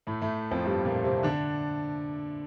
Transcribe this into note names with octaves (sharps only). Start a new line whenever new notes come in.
A2 A3
A2 A3
F2 F3
G2 G3
A#2 A#3
C3 C4
D3 D4